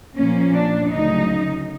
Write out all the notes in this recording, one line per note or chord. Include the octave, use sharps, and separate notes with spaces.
A#2 F3 A#3 C#4
D4
D2 C#3 F#3 D#4